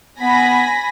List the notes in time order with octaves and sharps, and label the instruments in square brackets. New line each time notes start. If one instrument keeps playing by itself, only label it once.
[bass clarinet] B3 [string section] G#5 B5 A#6